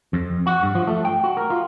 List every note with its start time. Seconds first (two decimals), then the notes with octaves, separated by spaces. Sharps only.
0.13 F2
0.47 F#4
0.63 G2
0.75 F3
0.87 A3
1.05 G5
1.24 F#4
1.37 A#4
1.50 F4